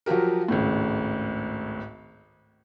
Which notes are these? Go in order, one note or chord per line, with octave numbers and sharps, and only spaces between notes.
F3 F#3 F#4 G4 A#4
G#1 C#2 A2